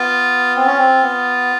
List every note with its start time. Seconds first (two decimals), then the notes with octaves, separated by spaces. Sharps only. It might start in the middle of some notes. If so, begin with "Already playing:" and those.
Already playing: B3 F4
0.55 C4 F4
0.67 C#4
0.77 C4
1.03 B3